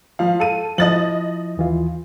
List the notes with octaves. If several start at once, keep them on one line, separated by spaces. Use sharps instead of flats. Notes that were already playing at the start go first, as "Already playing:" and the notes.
F3 F5
A4 D#7
F3 E4 D#5 A6 F#7
D#2 E3 F4